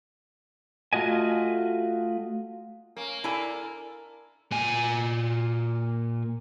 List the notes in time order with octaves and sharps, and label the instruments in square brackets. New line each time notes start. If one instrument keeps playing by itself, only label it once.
[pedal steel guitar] A3 F4 F#4 D#5 G#5
[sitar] A#3 [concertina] C#4
[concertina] D4 A4 A#4 [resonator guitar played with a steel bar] E4 G#5
[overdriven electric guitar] A#2 G#5